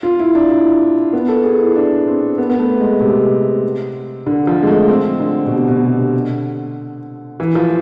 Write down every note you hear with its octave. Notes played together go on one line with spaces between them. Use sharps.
F4
E4
D4
E4
B3
A4
G#4
E4
D4
C4
B3
B3
A3
G#3
C3
D3
F3
G#3
A3
C4
D3
B2
C3
B2
C3
D3
E3
F3